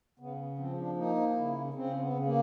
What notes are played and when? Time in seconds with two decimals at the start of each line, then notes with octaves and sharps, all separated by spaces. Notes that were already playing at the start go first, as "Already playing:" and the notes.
0.19 C#3 B3
0.58 F3 C4
0.77 D4
0.96 A#3 D#4
1.30 D#4
1.36 C#3 E4
1.74 C#3 C4
2.00 B3
2.13 C#3
2.25 A#3